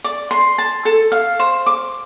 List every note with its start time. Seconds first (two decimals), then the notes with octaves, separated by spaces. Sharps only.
0.04 D5
0.31 C6
0.58 A5
0.85 A4
1.12 F5
1.39 C5
1.66 D6